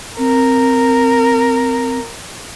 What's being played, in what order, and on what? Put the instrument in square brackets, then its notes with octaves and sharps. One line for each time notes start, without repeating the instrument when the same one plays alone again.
[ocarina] C4 [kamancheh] A#4